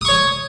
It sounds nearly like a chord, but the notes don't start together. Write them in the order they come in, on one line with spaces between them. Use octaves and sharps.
D#6 C#6 C#5